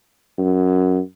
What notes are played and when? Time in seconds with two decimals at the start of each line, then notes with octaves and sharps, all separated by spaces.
0.38 F#2